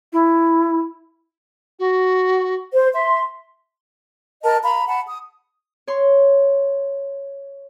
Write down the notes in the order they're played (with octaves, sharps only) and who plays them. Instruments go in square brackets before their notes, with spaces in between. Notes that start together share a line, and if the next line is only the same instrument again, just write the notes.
[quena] E4
[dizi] F#4
[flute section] C5
[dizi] E5 [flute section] C6
[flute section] A#4 D#5 A5
F5 A#5 B5
F#5 A5 B5
D#6
[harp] C#5 C6